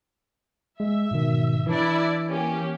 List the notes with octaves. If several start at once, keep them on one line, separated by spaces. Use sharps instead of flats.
G#3 E5
G#2 B2 D#3
E3 D4 E4 D5
A#3 C#4 G4